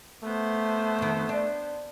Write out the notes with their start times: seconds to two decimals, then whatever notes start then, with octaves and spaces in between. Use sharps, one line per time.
0.24 A3 B3 C5
0.99 F2 D#3
1.29 D4